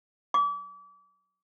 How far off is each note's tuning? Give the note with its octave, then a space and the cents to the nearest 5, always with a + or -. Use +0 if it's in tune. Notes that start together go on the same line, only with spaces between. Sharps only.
D6 -35